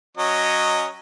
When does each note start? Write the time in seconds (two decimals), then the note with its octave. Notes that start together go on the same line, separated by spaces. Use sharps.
0.18 F#3 C#4 D#5